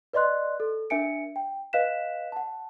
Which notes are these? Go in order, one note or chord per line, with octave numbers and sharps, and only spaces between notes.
B4 D5 D#5 C6 F#6
A4
D4 A#4 E5 G#5 C#7 D7
G5
B4 D#5 F5 F#6 B6 E7
F#5 A5